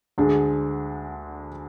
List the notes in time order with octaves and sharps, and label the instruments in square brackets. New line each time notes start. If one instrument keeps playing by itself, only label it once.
[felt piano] D2 D3 G#3 D4